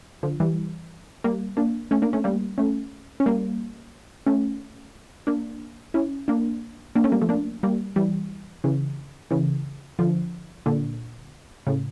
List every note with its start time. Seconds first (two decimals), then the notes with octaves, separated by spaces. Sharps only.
0.23 D3 F3
0.40 E3 G3
1.24 G3 A#3
1.57 A#3 D4
1.91 A3 C#4
2.02 A#3 D4
2.13 A3 C#4
2.24 G3 A#3
2.58 A3 C#4
3.20 C#4
3.26 G3 A#3
4.27 A3 C#4
5.27 A#3 D4
5.94 C#4 E4
6.28 A#3 D4
6.95 A#3 D4
7.04 A3 C#4
7.12 G3 A#3
7.22 F3 A3
7.29 A#3 D4
7.63 G3 A#3
7.96 E3 G3
8.64 C#3 E3
9.31 C#3 E3
9.99 D3 F3
10.66 A#2 D3
11.67 A2 C#3